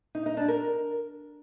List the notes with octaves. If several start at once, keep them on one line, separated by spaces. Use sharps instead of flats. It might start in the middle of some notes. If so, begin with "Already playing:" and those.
D#4
D#4
D4
A#4